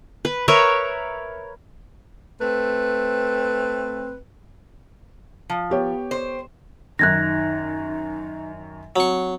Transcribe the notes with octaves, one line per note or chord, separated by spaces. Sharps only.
B4
A#4 B4 C#5 E5
A3 C4 B4
F3
B3 G4 C#5
C5
F#2 D#3 D#4 F#6 G#6 A#6
F#3 C4 C#6